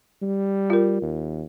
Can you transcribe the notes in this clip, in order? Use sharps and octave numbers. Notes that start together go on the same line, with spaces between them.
G3
F4 A#4
D#2